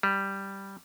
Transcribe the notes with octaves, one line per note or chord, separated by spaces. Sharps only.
G3